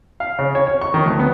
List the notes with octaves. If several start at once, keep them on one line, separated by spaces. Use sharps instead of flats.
F5
C#3
C#5
C#5
C#6
D#3
D2
B3